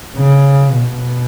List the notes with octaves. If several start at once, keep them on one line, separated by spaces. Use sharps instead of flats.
C#3
B2